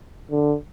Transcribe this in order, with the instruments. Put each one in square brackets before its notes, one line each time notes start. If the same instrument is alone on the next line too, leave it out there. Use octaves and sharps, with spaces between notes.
[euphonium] D3